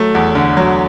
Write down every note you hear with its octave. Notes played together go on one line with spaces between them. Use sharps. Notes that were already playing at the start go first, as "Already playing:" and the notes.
Already playing: F#3 A3
E2
D3
F#3